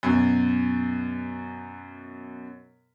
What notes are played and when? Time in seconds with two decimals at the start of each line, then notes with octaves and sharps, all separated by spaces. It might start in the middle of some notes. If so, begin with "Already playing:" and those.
0.03 F#2 B2